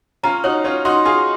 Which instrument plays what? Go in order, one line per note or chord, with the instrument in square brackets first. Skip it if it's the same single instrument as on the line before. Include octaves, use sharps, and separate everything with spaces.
[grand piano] C#4 F4 [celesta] A#5
[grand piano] D#4 F#4 [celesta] C#5
[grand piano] C#4 F4 [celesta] C#5
[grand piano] D#4 F#4 [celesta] C6
[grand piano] F4 G#4 [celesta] C6